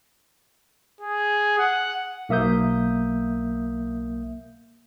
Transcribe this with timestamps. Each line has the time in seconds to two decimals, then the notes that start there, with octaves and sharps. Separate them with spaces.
1.01 G#4
1.59 F#5
2.29 B1 A#3 E5 D#6 G6